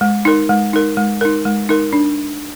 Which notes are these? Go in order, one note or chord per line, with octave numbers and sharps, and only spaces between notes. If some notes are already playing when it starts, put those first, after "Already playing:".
G#3
D#4 A#4
G#3
D#4 A#4
G#3
D#4 A#4
G#3
D#4 A#4
D4